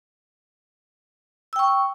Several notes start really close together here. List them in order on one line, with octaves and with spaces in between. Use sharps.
E6 G5 C#6